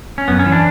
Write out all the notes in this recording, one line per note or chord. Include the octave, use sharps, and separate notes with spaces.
C#4
F#2 B3
C#4
E3
D4